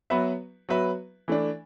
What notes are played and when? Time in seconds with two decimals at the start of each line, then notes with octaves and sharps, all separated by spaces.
0.10 F#3 B3 F#4 B4 E5
0.69 F#3 B3 F#4 B4 E5
1.28 E3 A3 D4